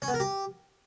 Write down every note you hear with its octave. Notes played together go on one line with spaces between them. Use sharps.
C#4
B3
A#4
G4